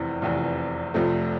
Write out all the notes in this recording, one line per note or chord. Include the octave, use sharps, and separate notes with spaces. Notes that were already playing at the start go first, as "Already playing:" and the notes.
Already playing: F1 E2 C3 E3
F1 E2 C3 E3
F1 F2 C3 F3 A3